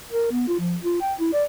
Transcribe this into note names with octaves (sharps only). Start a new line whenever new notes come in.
A#4
B3
F4
F3
F4
G5
E4
D5